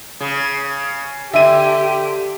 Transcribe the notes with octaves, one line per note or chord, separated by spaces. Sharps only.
C#3
D3 G4 E5 D#7